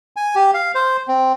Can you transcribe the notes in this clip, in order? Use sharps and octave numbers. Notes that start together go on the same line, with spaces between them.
G#5
G4
F5
C5
C4